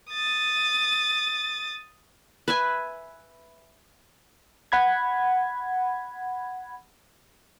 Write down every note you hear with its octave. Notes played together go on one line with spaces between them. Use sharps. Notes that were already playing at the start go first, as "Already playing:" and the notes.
D#6 A6
B4 E5 G#5
F#5 B5 G#6